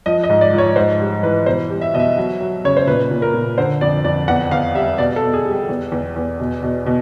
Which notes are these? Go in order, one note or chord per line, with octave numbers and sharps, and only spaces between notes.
F3 D#5
D#5
G#2
D5
F3
C#5
G#2 C5
G3
E3 B4
B2 C5
G3
E5
B2 D#5
E5
F#3
F#3
C#3 C#5
C5
A#2 B4
A#2
A#4
A#2
D3 C5
F2 D5
F2 D5
E2 F#5
E2 F5
G3 E5
B2 D5
A4
B2
G#4
G3
G4
E2
E2
E2
B2
B2
B2